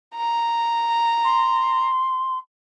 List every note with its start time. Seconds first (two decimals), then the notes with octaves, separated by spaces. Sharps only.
0.16 A#5
1.24 C6